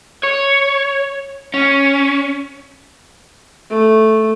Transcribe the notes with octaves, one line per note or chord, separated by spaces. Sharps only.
C#5
C#4
A3